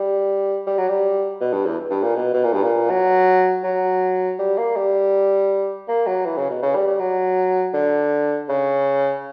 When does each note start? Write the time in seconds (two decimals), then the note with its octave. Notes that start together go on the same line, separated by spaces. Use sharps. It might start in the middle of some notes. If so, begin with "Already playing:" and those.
Already playing: G3
0.67 G3
0.78 F#3
0.89 G3
1.41 B2
1.53 G2
1.66 E2
1.90 G2
2.03 A#2
2.15 B2
2.33 B2
2.44 A#2
2.53 G2
2.63 A#2
2.90 F#3
3.64 F#3
4.39 G3
4.58 A#3
4.76 G3
5.88 A#3
6.06 F#3
6.25 E3
6.37 C#3
6.50 B2
6.62 C#3
6.75 G3
6.87 G3
6.99 F#3
7.74 D3
8.49 C#3